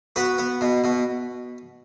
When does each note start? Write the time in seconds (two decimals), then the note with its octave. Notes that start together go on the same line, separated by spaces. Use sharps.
0.16 B3 F#4 B4
0.38 B3
0.61 B2
0.84 B2